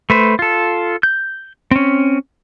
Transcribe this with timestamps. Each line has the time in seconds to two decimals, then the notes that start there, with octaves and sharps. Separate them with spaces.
0.10 A3 B4 C5
0.39 F4 A4
1.03 G6
1.71 C4 C#4